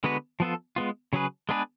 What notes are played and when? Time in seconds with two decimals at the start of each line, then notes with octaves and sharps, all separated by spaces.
0.04 D3 G#3 B3 F#4 B4
0.40 F3 B3 F4 A4
0.76 G#3 B3 F4
1.13 C#3 F#3 C#4 G#4 B4
1.49 G#3 B3 D4 G#4 B4